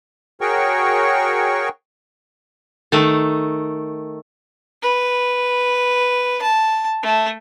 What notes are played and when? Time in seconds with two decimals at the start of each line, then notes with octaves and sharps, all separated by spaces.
0.41 F#4 G#4 A#4 C#5 G5 C#6
2.92 D#3 A3
4.82 B4
6.42 A5
7.03 A3